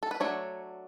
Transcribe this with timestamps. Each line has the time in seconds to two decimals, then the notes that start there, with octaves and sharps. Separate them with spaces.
0.03 A4
0.11 B4
0.20 F#3 A3 D4 C#5